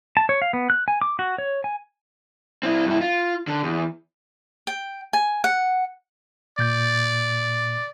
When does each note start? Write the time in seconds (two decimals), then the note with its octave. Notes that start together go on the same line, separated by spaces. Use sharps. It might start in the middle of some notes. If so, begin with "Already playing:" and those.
0.17 A5
0.29 C#5
0.42 F5
0.53 B3
0.70 F#6
0.88 G#5
1.02 D6
1.19 F#4
1.38 C#5
1.64 G#5
2.63 C4 E4
2.86 G2 E4
3.01 F4
3.47 D3
3.63 E2
4.67 G5
5.13 G#5
5.44 F#5
6.59 A#2 D5 G6 A6